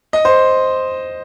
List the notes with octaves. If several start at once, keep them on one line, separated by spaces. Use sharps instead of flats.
D#5
C5